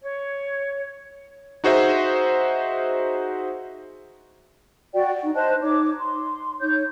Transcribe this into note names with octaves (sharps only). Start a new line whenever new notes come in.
C#5
D#4 F#4 G#4 C5 D#5 E5
F#4 D5 G5
D#4
C5 D#5 A5 F#6
D#4 C#5 D6
C6
D#4 C#5 G6